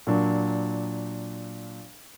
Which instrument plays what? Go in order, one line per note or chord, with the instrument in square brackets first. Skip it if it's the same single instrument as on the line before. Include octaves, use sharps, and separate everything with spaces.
[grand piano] A#2 F#3 D4